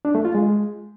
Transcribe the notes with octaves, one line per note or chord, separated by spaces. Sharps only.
D4
A3
F4
G#3